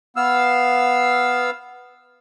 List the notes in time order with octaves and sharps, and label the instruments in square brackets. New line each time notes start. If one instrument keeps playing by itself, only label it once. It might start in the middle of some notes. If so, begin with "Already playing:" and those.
[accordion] B3 F5 E6